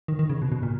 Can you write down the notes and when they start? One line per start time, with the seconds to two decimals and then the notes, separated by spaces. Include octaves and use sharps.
0.08 D#3
0.19 D#3
0.29 C#3
0.42 B2
0.52 B2
0.63 A#2